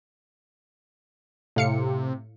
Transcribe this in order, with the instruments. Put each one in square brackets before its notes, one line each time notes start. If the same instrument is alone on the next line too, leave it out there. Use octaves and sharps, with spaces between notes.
[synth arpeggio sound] A2 F5 C#7 [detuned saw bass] C3